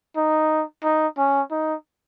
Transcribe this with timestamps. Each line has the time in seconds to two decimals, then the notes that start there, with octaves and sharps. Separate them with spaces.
0.16 D#4
0.84 D#4
1.18 C#4
1.51 D#4